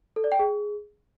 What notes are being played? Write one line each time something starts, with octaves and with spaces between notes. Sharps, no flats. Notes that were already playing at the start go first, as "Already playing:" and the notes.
A4
D5
G5
G#4